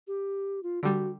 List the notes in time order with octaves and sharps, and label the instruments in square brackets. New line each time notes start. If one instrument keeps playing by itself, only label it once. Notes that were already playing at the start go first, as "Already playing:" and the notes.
[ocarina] G4
F4
[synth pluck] D3 G3 [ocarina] F#4